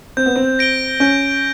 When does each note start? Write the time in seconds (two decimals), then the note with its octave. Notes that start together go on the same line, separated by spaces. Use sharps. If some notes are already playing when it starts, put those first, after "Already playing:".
0.17 C4 G6
0.26 B3
0.36 C4
0.59 A#6 D7 G7
1.00 C#4 G6